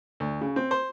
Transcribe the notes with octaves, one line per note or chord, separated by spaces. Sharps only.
D2
C#3
C4
C5